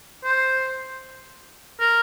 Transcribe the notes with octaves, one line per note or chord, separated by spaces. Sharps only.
C5
A#4